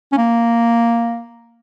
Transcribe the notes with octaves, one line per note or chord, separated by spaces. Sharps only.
C#4
A#3